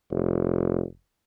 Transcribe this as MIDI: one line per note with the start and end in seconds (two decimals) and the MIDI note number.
0.11 0.82 29